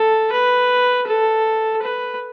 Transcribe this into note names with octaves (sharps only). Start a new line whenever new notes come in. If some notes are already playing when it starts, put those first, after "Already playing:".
Already playing: A4
B4
A4
B4